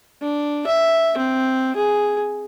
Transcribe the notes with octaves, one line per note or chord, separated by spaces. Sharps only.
D4
E5
C4
G#4